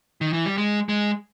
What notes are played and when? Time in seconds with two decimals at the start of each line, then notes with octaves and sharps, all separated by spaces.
0.21 D#3
0.33 E3
0.46 G3
0.57 G#3
0.89 G#3